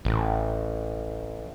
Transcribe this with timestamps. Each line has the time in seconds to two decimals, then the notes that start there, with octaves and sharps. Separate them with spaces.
0.05 A1